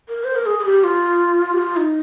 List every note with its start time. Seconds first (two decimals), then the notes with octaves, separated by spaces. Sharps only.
0.09 A#4
0.24 C5
0.36 A#4
0.46 G#4
0.59 G#4
0.65 G4
0.84 F4
1.53 G4
1.58 F4
1.77 D#4